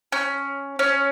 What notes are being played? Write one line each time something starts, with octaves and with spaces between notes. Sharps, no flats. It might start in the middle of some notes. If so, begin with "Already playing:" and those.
C#4
C#4